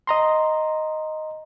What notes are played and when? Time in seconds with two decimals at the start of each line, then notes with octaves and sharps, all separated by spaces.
0.07 D#5 A#5 C6